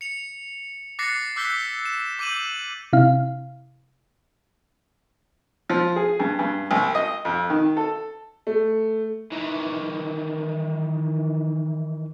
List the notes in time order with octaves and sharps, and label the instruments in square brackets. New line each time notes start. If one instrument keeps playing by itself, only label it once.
[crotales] C#7 F7
D6 F#6 A6 A#6 C7 C#7
D6 E6 F#6 G6 B6 G7
E7
D6 G6 D#7 E7 F#7
[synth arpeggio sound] C3 E4 F5
[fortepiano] F3
G#4
G2
G2
C2
D#5
F2
D#3
A4
[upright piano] A3
[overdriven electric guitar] D#3 E3